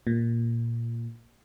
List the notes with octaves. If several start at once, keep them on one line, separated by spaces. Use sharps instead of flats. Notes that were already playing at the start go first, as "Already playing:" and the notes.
A#2